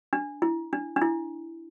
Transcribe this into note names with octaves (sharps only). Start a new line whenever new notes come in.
D4
E4
D4
D4
E4